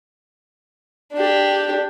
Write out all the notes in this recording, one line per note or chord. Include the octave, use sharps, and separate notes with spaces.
D4 G4